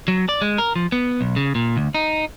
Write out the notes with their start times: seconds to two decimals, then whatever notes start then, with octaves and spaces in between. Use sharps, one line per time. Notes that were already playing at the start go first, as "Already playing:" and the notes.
0.08 F#3
0.29 D5
0.42 G#3
0.58 A#4
0.76 F3
0.92 B3
1.21 B1
1.36 C#3
1.55 A#2
1.77 D2
1.95 D#4